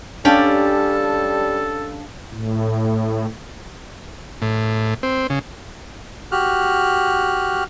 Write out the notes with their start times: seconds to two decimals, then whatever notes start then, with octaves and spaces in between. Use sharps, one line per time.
0.25 G3 C#4 D4 G4 A4 D5 F5 A5
2.31 A2
4.42 A2
5.03 C4
5.30 C#3
6.32 F#4 G4 F6 F#6